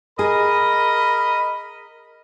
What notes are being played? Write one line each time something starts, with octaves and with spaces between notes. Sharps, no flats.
G#4 A#4 D#5 B5